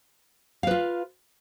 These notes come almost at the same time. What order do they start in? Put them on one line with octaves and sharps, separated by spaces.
F5 B4 F4